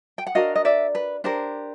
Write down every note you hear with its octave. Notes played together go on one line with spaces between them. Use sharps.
G5
F#5
D4 F#4 A#4 D#5 F5
D#5
D5 E5
B4
D4 G4 A#4 C5